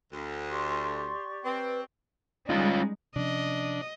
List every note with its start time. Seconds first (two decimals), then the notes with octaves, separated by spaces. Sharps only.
0.13 D2
0.50 G4 D5 C6 C#6
1.44 C4 B4
2.50 G3 G#3 C#4 D#4 F4
3.16 C3 F3 C#4 D4 D#5